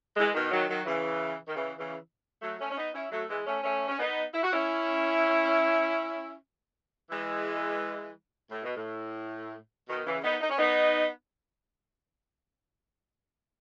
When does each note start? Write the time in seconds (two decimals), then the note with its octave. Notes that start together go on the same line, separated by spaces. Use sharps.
0.16 E3 G#3
0.34 B2 D#3
0.51 D#3 F#3
0.68 D#3 F#3
0.85 C#3 E3
1.47 D#3
1.55 C#3 E3
1.78 C#3 E3
2.41 F#3 A3
2.59 A3 C#4
2.70 C#4
2.76 B3 D#4
2.94 C#4 E4
3.11 F#3 A3
3.28 E3 G#3
3.46 A3 C#4
3.63 A3 C#4
3.88 C#4
3.98 B3 D#4
4.32 E4
4.43 F#4
4.52 C#4 E4
7.10 E3 G#3
8.50 A2
8.63 B2
8.75 A2
9.88 B2 D#3
10.06 C#3 E3
10.23 B3 D#4
10.40 D#4
10.49 C#4
10.57 B3 D#4